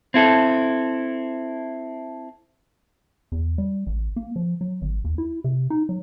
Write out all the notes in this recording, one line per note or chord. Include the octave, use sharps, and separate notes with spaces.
C4 E4 A4
E2
G3
A1
A#3
F3
F#3
G#1
D#2
E4
C3
D#4
F#3